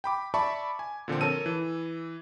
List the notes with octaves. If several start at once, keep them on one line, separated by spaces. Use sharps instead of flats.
G5 B5 D6
D5 E5 A5 B5 C#6
G#5
A#2 D3 F3 C4
A4 A#4 C#5 A5 E6 D#7
E3